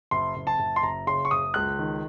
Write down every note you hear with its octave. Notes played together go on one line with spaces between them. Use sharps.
F#1 C6
F#1
A5
F#1
C6
F#1 A#5
C#3 C6
C#6
F#1 D#6
C#2 F#6
D#3